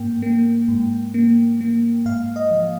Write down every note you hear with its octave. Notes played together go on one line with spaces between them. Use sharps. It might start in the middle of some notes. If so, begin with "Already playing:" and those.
Already playing: G#2 A#3 G5
A#3
G#2
A#3
A#3
G#2 F5
D#5
F3